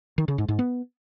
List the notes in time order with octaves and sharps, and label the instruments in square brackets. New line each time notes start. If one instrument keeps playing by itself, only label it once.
[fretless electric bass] D#3
C#3
G#2
G#2
B3